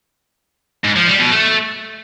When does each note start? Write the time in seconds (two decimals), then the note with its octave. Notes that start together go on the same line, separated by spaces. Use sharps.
0.84 G#2
0.96 F3
1.07 G3
1.19 B2
1.31 A3